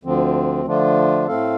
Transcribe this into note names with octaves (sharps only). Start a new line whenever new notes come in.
D2 D3 F3 C4
D3 F3 A3 D4 F4
A2 A3 C4 A4 F5